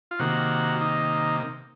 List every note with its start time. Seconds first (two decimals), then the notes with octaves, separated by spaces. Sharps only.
0.11 F4
0.19 C3 D#3 A#3 F#4
0.81 D#4